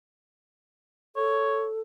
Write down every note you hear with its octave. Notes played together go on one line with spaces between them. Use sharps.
A4 C#5